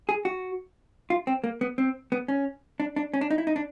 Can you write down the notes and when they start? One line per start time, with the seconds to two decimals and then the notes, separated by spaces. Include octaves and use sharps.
0.09 G#4
0.25 F#4
1.10 F4
1.27 C4
1.44 A#3
1.61 B3
1.78 C4
2.12 B3
2.28 C#4
2.80 D4
2.96 D4
3.14 C#4
3.21 D4
3.31 D#4
3.38 E4
3.47 D#4
3.56 D4